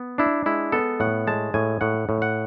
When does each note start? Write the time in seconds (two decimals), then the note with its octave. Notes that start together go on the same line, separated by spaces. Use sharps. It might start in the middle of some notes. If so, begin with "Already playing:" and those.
Already playing: B3
0.18 D4 E4
0.46 G#3 E4
0.72 B3 A4
1.00 A2 F#5
1.27 G#3 A5
1.54 A2 G#5
1.81 A2 F#5
2.09 A2
2.22 F#5